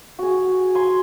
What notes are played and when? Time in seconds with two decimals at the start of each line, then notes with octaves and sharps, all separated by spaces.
0.19 F#4 G#4
0.75 G#5 C6